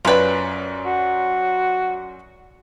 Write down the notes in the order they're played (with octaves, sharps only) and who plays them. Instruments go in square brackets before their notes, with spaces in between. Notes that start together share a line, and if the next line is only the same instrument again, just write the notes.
[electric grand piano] F#2 C#4 D5 [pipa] F4 B4
[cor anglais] F#4